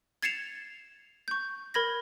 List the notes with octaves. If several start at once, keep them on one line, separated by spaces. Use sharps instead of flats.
G#6 A6 C7 C#7 E7 F7
C#6 G6
A#4 B5 G#6 A#6